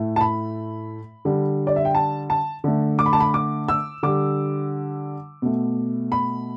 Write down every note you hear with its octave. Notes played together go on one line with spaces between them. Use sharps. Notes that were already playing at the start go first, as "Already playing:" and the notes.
Already playing: A2 A3
A5
B5
D3 G3
D5
E5
G5
A5
A5
D3 A3
D6
B5
A5
B5
D6
E6
D3 G3 D6
B2 A3
B5